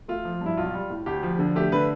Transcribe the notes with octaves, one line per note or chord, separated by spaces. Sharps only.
A3 F4
F3
G2 E4
B1 F4
G3
A2
D2 G4
F3
D3
A3 G4
D3 B4